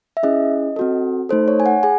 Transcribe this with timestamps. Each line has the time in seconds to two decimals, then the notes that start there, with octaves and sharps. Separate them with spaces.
0.17 E5
0.23 C#4 E4 G#4 D#5
0.76 C4 F#4 A4
1.29 A3 D#4 A4 C5
1.48 C#5
1.60 G#5
1.66 F#5
1.83 G#4 G#5